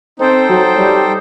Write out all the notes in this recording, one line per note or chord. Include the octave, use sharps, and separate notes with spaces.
C4 D#4 A4 C5 G5
F#3
G3